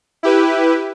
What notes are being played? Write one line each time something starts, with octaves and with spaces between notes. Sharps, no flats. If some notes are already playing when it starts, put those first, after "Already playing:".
E4 G4 B4